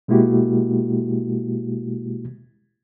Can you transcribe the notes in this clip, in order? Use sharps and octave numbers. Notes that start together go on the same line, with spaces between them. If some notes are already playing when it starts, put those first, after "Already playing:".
B2 G#3 A#3 E4 F#4 G4